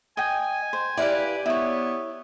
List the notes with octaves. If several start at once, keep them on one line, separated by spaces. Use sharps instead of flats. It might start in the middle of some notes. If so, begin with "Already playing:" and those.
D#5 G5 G#5
C5
E4 G4 B4 D5 F5
B3 E4 C#5